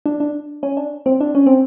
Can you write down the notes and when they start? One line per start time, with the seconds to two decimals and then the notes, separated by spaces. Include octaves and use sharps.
0.06 D4
0.20 D4
0.63 C#4
0.77 D4
1.06 C4
1.21 D4
1.35 C#4
1.46 C4